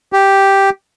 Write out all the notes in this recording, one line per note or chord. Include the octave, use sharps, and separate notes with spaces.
G4